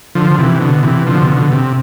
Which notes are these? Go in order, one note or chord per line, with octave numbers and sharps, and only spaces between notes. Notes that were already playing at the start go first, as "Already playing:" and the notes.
D3 F3
D3
C3 E3
B2 D3
C3 E3
D3 F3
B2
C3
B2 D3
C3